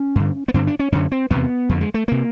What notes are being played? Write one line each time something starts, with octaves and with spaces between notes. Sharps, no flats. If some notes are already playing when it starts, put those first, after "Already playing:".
Already playing: C#4
G2 D3
B3
G2 D3 C4
D4
C#4
F#2 D3 C#4
C4
E2 C3 B3
F2 D3
G#3
A3
C3 A#3